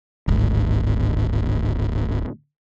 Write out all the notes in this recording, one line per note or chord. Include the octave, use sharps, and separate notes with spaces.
D1 G#1